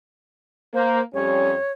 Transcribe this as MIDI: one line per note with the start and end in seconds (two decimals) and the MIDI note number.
0.74 1.01 58
0.74 1.01 72
1.14 1.54 41
1.14 1.54 55
1.14 1.54 61
1.14 1.72 73